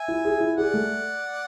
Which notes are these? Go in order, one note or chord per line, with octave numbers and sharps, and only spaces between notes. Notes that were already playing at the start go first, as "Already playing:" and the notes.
Already playing: E5 G#5
E4
G#4
E4
G#4 D5 F#5
A3